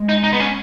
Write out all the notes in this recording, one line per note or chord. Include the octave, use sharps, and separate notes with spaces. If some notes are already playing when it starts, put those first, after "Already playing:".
Already playing: G#3
D#4
D#4
B3
C#4